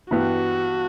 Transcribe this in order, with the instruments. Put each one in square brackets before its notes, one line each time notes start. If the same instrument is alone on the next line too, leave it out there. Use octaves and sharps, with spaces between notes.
[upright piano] G2 E3 G3 B3 [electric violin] F#4